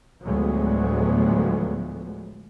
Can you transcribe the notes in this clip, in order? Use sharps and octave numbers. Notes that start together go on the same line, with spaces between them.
D2 A2 F3 F#3 G#3 B3